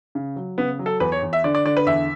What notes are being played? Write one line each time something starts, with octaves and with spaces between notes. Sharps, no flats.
C#3
F#3
C#3 B3
F#3
A4
E2 B4
C#5
E2
E5
D3 D5
D5
D3 D5
B4
E2 E5